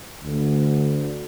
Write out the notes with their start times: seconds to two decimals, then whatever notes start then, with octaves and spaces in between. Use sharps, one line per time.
0.23 D2